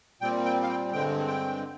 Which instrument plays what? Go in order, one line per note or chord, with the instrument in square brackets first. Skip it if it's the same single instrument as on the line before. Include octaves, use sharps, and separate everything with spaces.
[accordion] A#2 G3 C4 G5
G5
F5
G5
G2 D3 G#3 C4 G5
G5